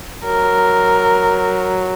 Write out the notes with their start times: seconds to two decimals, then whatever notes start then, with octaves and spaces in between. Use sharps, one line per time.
0.24 F#3 A#4